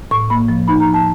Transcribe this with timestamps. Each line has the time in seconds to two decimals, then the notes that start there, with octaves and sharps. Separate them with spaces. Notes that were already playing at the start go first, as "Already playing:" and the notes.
0.11 A2 C#6
0.30 A#3 B5
0.48 F3
0.68 D#4 B5
0.80 A#5
0.87 F3
0.94 A5